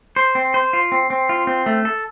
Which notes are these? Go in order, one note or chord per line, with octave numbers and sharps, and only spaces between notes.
C5
C4
C5
F4
C4
C4
F4
C4
A3
A4